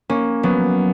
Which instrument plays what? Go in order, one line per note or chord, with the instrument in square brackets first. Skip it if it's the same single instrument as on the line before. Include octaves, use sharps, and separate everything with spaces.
[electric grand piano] A#3 [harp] C#4
[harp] F#3 [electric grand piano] B3